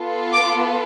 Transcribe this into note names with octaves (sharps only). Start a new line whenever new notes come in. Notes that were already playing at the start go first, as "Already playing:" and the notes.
Already playing: B3 F4 A4
D6